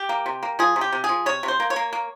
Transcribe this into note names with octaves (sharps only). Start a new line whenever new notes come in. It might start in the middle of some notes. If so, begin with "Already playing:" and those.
Already playing: G4
A#3
C3
A#3
F3 G#4
C3
G4
C3
G#4
F3
C3 C#5
C3
C5
A#3
C#5
A#3
A#3